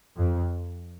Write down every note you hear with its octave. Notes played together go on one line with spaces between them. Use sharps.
F2